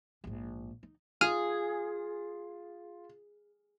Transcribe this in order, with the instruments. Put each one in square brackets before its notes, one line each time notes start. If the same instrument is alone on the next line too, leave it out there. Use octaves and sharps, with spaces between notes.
[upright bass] A#1 G#2
D#4
[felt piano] F4 [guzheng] G#4 [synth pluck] F6 D#7